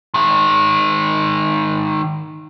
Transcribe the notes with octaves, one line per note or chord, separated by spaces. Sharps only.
D#3 G#3